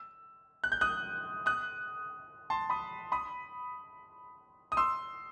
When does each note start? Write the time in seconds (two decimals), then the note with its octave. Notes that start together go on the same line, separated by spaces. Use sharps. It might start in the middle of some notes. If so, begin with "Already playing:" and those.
Already playing: E6
0.64 F#6
0.72 G6
0.81 D#6 F#6
1.46 D#6 F#6
2.50 A5 C6
2.70 B5 D#6
3.12 B5 D#6
4.72 D#6
4.77 C6 E6